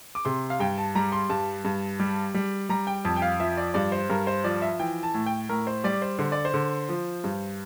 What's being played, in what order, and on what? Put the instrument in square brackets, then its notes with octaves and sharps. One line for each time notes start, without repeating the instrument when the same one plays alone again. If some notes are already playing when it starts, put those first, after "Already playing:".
[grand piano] D6
C3 C6
F5
G2 G5
A5
G3 A#5
C6
G2 A5
G2
G3
G3
G3 A#5
G5
F2 A5
G5
F5
F3 E5
D5
G2 D5
C5
G2 A#4
C5
F3 D5
E5
E3 G5
A5
A2
G5
A2 A#4
C5
G3 D5
C5
D3 C5
D5
C5
D3
F3
G2